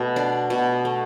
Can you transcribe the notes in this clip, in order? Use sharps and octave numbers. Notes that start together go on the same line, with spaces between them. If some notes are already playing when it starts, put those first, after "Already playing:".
Already playing: B2 A3
D4
B2
A3